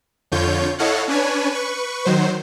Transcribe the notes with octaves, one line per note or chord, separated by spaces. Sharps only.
F2 D3 F4 C#5 G6
E4 A4 C#5 D#5 F5 F#5
C#4 D4 B4 C#5 G#5
B4 C#6
D#3 F#3 C5